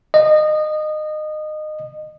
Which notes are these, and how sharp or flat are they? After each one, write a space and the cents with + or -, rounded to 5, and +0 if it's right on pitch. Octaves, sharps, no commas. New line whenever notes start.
D#5 -25